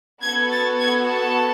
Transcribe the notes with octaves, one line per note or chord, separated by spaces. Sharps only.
B3 F#4 A4 G#6
A6
G#6
A5